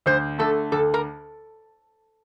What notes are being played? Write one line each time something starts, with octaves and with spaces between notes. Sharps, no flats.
D2 C5
D3 A3 A4
D2 A4
A#4